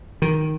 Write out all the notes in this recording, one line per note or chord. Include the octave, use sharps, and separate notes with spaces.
D#3